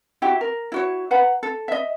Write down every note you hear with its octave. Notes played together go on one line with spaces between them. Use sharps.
E4 F#4 G4
A#4
E4 F#4 C#5
B4 F#5 A#5
A4
D#5 E5